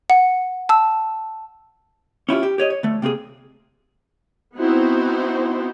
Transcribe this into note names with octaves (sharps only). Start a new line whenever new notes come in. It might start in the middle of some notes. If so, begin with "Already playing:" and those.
F#5
A5 E6
C#4 E4 F4 G4
G4
G4 C#5 D#5
C#5
D2 A3
C3 A#3 C4 G#4
B3 C4 D#4 E4 F#4 C5